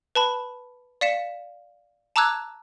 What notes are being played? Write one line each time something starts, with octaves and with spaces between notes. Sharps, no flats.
B4 A5 B5
D5 F5 B6 C#7 E7
A5 A#5 D6 E6 F#6 G#6